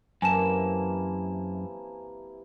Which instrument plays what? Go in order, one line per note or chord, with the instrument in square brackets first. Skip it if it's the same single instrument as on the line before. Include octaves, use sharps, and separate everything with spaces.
[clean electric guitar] F#2 [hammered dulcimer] C3 E3 A#3 [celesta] G#5 A5 E7